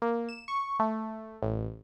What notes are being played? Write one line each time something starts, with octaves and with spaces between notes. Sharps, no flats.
A#3
E7
C#6
A3
A1